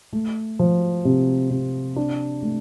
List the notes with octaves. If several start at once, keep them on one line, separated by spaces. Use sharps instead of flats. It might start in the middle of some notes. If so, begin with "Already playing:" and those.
A3
F3
C3
C3
D4
A3